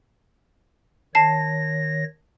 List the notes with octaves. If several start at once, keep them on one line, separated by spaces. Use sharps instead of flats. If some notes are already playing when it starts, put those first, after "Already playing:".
D#3 C#5 A5 A#6 C7